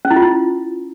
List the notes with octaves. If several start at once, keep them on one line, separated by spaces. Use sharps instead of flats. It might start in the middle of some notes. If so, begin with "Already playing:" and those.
C#4
E4
F4
E4